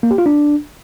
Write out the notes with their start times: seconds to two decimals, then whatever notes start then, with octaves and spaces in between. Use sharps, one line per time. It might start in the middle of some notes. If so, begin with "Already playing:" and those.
0.03 A#3
0.11 G4
0.18 F4
0.26 D4